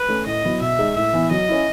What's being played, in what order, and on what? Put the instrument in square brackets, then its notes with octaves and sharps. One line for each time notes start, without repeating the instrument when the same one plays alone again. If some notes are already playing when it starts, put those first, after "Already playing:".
Already playing: [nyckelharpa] B4
[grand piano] A3 C#4
[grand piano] A2 [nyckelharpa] D#5
[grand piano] F#3 B3 E4
[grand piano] B2 [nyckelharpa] E5
[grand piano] G#3 D#4 G#4
[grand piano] A2 [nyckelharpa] E5
[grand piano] E3 B3
[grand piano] F#3 [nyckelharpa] D#5
[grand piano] C#4 E4